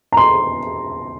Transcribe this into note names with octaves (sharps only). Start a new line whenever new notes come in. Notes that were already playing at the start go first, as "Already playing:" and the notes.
A#5
C6